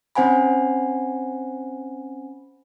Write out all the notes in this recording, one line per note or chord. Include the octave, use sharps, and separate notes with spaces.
C4 C#4 C5 F#5 G#5 B5